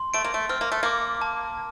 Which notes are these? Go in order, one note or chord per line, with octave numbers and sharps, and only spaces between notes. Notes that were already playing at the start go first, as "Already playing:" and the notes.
Already playing: C6
A3 D7
A#3
A3
C4 F6
A#3
A3
A#3 D6
A5